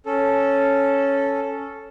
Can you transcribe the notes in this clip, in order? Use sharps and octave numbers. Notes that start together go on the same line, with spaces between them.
C#4 A4